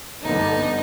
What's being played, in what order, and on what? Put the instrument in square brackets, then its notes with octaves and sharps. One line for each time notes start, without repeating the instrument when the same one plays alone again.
[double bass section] G2 D3 B3 [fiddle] D#4